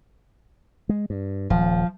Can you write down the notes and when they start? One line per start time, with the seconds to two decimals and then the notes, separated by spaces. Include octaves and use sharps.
0.89 G#3
1.10 G2
1.50 D#1 F3